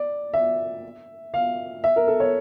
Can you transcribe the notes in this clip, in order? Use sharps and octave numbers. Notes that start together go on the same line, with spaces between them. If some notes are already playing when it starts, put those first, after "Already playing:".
Already playing: D5
E5
F5
E5
A#4
A4
C#5